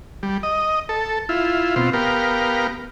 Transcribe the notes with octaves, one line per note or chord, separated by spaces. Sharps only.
G3
D#5
A4
E4 F4
B2 C4 F4
B3 G4 A#4 F5